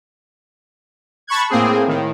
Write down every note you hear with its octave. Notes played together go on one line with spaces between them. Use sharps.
A5 B5 C#6 F#6 G#6
A2 A#3 C4 G#4
A2 D#3